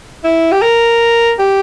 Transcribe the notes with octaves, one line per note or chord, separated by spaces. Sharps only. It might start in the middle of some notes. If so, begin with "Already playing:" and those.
E4
G4
A#4
G4